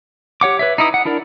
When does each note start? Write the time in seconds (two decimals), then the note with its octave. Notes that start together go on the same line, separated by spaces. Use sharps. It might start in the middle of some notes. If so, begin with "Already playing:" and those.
0.41 G4 C#5 F#5 D6
0.59 B4 C#5 E5
0.78 D#4 E4 D#6
0.94 F#5
1.05 D4 E4 A#4 D5